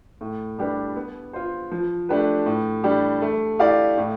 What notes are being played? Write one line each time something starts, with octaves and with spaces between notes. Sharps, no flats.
A2
G3 D4 G4 B4
B3
F4 C5
F3
A3 D4 G4 B4
A2
G3 D4 G4
A3
E4 G4 D5 F5
A2